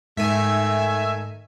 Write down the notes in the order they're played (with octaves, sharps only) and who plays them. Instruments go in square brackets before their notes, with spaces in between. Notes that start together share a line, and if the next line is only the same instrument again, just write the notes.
[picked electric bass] G#2 [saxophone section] D#3 A3 [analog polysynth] E5 G#5